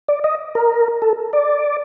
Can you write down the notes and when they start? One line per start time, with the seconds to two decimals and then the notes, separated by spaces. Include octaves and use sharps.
0.08 D5
0.24 D#5
0.55 A#4
1.02 A4
1.33 D5